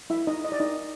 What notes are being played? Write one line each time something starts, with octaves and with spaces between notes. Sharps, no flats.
E4 E5
D#4 D#5
D#5
D5
D#4 D#5